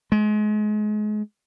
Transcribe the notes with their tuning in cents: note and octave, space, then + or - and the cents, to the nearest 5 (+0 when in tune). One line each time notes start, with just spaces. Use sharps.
G#3 +30